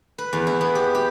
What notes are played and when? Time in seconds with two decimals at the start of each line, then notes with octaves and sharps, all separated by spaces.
0.18 B4
0.33 E2
0.47 E4
0.61 B3
0.75 G4
0.95 G4